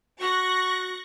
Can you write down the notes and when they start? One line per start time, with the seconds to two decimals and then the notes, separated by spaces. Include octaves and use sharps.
0.19 F#4 C#6 F#6 A#6